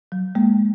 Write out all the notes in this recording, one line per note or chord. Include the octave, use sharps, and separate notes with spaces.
F#3
G#3 A#3